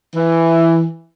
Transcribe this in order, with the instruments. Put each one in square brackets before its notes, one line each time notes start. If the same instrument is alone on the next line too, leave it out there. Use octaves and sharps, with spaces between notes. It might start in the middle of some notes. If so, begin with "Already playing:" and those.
[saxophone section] E3